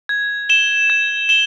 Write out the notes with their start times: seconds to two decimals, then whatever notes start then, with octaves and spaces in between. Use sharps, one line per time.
0.09 G#6
0.49 E7 G7
0.90 G#6
1.29 E7 G7